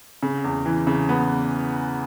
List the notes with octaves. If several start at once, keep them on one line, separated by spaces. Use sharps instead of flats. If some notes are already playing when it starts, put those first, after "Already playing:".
C#3
E2
E3
C#3
B3